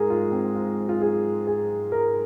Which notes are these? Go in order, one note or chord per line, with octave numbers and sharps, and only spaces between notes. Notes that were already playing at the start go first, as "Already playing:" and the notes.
Already playing: G#2 G#4 A#4
F4
C4
F4
F4
G#4
G#4
A#4